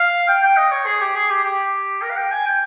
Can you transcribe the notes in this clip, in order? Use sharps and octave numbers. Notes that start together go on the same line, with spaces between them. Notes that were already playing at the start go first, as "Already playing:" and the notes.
Already playing: F5
G5
G5
D#5
C#5
G#4
G4
G#4
G4
G4
A#4
F5
G5
G#5
G5